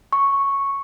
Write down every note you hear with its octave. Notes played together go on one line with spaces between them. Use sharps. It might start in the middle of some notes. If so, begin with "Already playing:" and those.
C#6